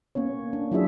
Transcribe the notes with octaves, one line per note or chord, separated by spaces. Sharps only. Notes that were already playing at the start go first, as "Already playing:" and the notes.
A#3 B3 C#4 C#5
D4
F#3 D4 E4 F4 G#4 E5